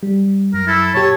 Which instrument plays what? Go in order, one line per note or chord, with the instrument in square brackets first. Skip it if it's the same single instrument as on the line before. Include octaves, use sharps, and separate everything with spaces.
[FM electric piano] G3
[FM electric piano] F#2 [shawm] A#4
[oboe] E4 [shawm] A4
[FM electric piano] A#2 G4 [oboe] C#5 [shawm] A5